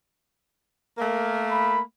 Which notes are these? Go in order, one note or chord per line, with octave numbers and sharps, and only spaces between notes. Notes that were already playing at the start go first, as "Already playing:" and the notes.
A3 A#3
B5